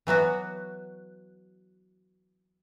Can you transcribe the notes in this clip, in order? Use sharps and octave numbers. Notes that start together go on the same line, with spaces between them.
E3 F#3 B3 F#4